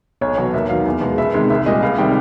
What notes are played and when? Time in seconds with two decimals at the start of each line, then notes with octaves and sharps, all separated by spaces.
0.21 B1 C#5
0.37 B2 F#3
0.53 D#2 E5
0.69 D#3 F#3 F5
0.86 E2
1.01 B2 G#3
1.18 C#2 E5
1.34 C3 D#3 G#3
1.50 C2 E5
1.66 A#2 G3 D#5
1.83 C#2 F5
1.98 C3 D#3 G3 G5